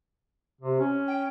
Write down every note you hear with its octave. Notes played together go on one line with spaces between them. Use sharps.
C3
C#4
G5